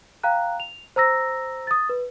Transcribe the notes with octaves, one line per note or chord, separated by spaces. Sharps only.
F5 G5 A#5 F#6
F7
C5 A#5 E6 A#6
D#6 A6
B4